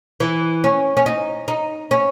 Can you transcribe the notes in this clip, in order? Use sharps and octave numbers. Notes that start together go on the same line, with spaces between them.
E3
C#4
C#4
D#4
D#4
C#4